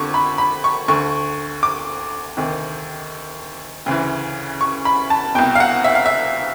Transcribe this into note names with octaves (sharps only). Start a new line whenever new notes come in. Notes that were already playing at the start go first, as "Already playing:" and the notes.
Already playing: F2 D3 C#6 D6
B5
B5
C#6
D2 D3 C#6
D6
D2 C3 D#3
D2 C#3 E3
C#6
B5
A5
C2 B2 G5
F5
F#5
E5
F5
E5